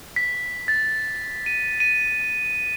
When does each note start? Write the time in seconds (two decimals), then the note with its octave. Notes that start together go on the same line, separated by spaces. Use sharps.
0.16 B6
0.68 A6
1.46 D#7
1.80 D#7